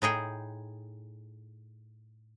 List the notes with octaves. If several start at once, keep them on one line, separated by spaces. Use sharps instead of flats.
A2 D#4 G#4 G5